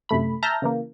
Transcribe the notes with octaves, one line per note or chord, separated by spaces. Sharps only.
F#2 C3 A3 B5
E5 A5 A#5 F6 G6 A#6
C#3 E3 A#3